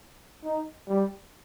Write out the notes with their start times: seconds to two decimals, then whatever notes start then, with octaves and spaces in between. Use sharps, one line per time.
0.44 D#4
0.88 G3